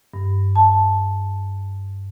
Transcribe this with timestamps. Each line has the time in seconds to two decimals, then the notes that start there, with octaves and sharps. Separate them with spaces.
0.14 G2
0.56 A5